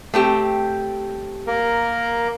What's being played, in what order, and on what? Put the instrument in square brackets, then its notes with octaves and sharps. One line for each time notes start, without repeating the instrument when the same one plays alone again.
[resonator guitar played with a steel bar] A3 C4 G4
[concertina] A#3 A#4